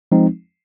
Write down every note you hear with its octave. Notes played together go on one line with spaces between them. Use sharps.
F3 G#3 C4 D#4